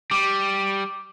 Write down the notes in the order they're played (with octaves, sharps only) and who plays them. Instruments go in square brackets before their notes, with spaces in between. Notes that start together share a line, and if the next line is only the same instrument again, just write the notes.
[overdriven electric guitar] G3 [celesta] D6